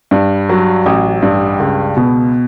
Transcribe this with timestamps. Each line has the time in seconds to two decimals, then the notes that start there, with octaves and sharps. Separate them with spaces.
0.11 G2
0.49 F#3
0.86 A1
1.22 G2
1.60 C#2
1.97 B2